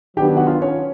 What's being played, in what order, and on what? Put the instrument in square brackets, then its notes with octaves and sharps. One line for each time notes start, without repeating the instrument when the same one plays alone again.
[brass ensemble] D#3 F#3 B3 D4 [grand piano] G4 G5
[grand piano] F#4 F#5
F4 F5
C#4 C#5